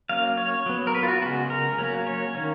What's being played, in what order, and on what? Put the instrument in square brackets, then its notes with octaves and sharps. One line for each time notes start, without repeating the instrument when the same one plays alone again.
[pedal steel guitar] F#3 A#3 C#4 F5
C#5
F#3 B3
A#4
B4
F4
F#4
C#3 G#3 B3 F#4
A#4
F#3 A#3 C#4
C#5
D#3 A#3 C#4